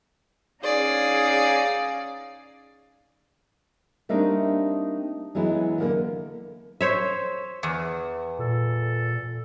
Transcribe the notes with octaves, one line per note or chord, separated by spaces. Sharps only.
C#4 D#4 G#4 D5 F5
G3 A3 A#3 C4 D4 D#4
E3 F#3 G#3 B3 E4
D3 A#3 B3
C5 C#5 E5
E2
A#2 A4